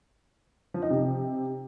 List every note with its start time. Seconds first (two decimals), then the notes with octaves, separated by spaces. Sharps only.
0.74 F3
0.82 D#4
0.90 C3